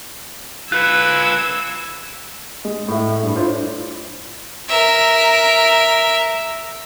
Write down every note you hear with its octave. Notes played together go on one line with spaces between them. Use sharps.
F4 B4 E6 F#6 G#6
G#3
A2 A3 E5
G2
D4 E4 F4 C5 C#5
A#4 E5